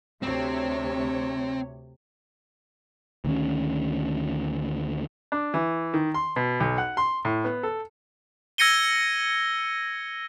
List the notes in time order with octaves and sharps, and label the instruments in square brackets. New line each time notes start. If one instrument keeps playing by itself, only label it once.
[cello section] D2 C3 C#5 [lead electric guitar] C4
[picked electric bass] D2 D#3 C#4
[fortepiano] D4
E3
D#3
C6
B2
B1
F#5
C6
A2
B3
A4
[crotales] E6 G#6 A#6 C#7 D#7 G7